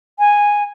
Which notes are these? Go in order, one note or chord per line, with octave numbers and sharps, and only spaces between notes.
G#5